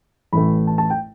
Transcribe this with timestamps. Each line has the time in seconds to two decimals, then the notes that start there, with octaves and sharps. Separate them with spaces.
0.33 A1 A2 E3 A3 B5
0.67 A5
0.78 A5
0.90 G5